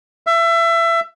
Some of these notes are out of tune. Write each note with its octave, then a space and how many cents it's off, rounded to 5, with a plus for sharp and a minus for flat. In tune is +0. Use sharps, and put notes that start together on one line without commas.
E5 +25